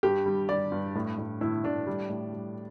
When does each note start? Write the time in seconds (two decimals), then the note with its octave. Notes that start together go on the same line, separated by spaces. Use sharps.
0.03 G2 G4
0.26 G3
0.49 G3 D5
0.72 G2
0.95 A2
1.18 A2
1.41 A2 E4
1.63 A2 D4
1.87 G3
2.09 A2
2.32 G3